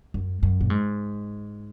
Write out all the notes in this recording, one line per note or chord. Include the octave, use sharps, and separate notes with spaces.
F#2
F#2
A#2
G#2